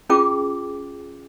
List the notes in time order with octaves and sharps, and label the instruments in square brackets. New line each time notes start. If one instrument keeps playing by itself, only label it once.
[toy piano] C#4 F4 G#4 G5 D6